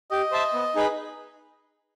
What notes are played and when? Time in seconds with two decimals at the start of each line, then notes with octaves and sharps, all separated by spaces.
0.11 G4 D#5
0.32 C5 E5 A5
0.53 B3
0.75 D#4 G#4 B4